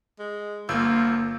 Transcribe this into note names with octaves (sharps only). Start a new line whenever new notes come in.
G#3
G1 A#3 F4 E6 G6